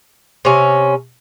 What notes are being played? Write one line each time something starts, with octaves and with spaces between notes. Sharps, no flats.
C3 C#4